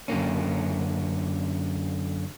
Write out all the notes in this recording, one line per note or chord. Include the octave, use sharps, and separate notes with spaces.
F#2 D3 A#3 C#4